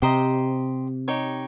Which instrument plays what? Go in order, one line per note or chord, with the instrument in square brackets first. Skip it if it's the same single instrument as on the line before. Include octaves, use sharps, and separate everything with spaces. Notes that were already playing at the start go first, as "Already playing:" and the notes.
[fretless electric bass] C3 [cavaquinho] G4 C5 D#5 A#5
[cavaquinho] D#4 G4 C#5